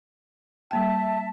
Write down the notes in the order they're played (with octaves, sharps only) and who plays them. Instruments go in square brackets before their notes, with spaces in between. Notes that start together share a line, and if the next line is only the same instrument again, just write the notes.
[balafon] G3 A#3 G5 [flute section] E5 A5